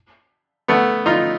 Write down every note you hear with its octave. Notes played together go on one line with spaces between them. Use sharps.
A3 B3
D#4 F4